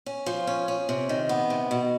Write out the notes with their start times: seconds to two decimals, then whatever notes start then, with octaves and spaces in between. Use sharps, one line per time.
0.06 C#4
0.26 F3
0.47 C#4
0.68 C#4
0.89 C3
1.09 D#3
1.29 B3
1.50 C3
1.71 B2